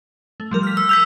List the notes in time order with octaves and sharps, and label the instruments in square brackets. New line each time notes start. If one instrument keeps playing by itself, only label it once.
[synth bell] A3
F3 G3 A#4
F6 B6
[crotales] E6
[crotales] E6 G6 B6 [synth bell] F7